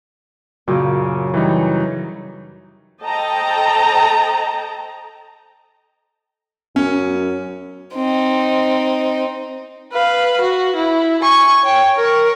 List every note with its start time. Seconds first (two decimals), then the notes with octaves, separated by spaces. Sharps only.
0.68 F#2 A#2 C#3
1.34 E3 G3 D#4
3.02 A4 C5 D#5 G5 A5 A#5
6.76 F#2 C#4
7.94 C4 D#4
9.93 B4 F5
10.41 F#4
10.76 E4
11.22 G#5 C#6
11.63 C#5 G5
11.96 A#4 C#6